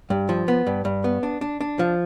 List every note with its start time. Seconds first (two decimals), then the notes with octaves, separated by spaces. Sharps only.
0.10 G2
0.29 F3
0.48 B3
0.67 G2
0.85 G2
1.04 B3
1.23 D4
1.41 D4
1.61 D4
1.79 F3